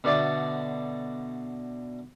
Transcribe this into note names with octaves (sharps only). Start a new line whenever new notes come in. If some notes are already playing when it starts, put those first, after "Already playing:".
B2 D3 D5 E5 D6